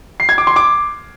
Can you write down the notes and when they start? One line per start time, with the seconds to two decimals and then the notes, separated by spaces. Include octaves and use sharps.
0.20 C7
0.29 G#6
0.38 D6
0.47 C6
0.56 D6